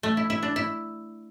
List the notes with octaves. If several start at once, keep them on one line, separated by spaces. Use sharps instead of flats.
A3
E4
E4
D4
E4